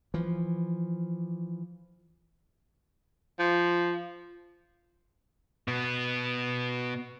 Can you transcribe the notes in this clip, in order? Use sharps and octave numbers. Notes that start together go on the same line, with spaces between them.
E3 F3
F3
B2 B3